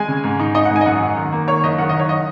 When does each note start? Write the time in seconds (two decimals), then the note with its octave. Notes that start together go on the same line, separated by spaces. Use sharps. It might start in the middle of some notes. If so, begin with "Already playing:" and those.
Already playing: G#3 G#5
0.08 C#3
0.24 G#2
0.40 D#4
0.55 D#4 D#5
0.65 F#5
0.70 G#2
0.76 G#5
0.81 D#5
0.86 F#2 F#5
1.01 F#2
1.17 D#3
1.32 A#3
1.48 D#3 C#5
1.63 F#1 D#5
1.78 D#3 F#5
1.89 F#1 D#5
1.99 C#5
2.09 D#5